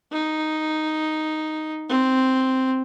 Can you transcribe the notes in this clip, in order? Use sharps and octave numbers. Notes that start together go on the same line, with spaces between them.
D#4
C4